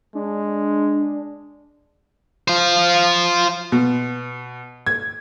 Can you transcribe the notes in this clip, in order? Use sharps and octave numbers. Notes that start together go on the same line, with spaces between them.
G#3 D4
F4 C5
B2
G#6